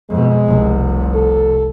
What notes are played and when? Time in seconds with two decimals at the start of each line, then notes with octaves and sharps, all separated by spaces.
0.10 F2 B2 G#3
0.48 F1 C2
1.15 A4